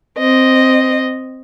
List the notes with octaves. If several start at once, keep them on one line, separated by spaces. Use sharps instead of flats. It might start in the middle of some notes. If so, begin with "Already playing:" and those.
C4 D#5